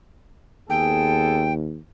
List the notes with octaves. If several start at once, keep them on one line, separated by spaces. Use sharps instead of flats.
D#2 B3 G#4 A4 G5